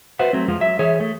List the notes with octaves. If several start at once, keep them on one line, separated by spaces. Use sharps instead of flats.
F#4 B4 C5 E5 F#5
F#3 A3 C4
F2 F3 G#3 F4
F#3 E5
E3 G#4 C#5 E5
A3